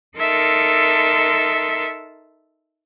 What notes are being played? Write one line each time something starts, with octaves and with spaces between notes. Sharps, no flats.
D#4 A4 A#4 E5 A5 C6